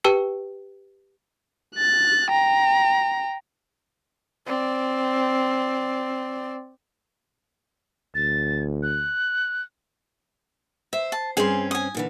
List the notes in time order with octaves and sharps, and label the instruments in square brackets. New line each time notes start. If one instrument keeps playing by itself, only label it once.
[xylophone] G4 B4 G5 A5 E6 C#7
[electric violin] F#6 A6
G5 A#5
[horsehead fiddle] C4 D5
[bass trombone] D2 [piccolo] A6
[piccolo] F#6
[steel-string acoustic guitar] C5 [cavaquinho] E5
[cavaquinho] A5
[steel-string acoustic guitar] G2 C4 C#4 [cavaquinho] G#4 C6
[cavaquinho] G#5 D#6
[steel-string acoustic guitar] A#2 D3 E3